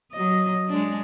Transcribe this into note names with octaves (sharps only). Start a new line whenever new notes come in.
F#3 D#5
G#3 D4